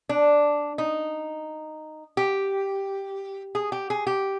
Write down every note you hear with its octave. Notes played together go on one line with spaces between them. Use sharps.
D4
D#4
G4
G#4
G4
G#4
G4